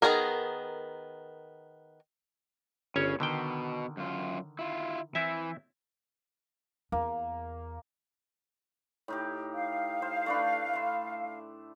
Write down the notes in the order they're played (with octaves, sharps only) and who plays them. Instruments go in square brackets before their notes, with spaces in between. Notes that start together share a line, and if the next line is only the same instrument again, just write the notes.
[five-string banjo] D#3 A3 B3 G#4 A#4
[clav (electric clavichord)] G1 C#4 C#5 [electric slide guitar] C#3
[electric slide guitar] B2 [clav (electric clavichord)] D3 D#3 G5
[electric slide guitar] F#2 F4
E4 F4
[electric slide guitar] E3 [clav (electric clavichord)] C4 E4 E5
[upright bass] E2 [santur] A#3
[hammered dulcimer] A2 D#4 G4
[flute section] F5
[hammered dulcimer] C5
A3 D4 B4
E5 C6